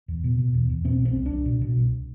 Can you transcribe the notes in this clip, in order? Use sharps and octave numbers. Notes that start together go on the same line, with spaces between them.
E2
B2
B2
E2
E2
B2 C4
C2
C4
C2
D4
C2
B2
B2
C2